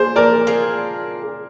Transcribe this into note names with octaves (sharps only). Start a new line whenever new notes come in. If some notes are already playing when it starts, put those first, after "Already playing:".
Already playing: G#3 D4 F4 G#4 C5
A#4 D5
G#3 D4 F4 G#4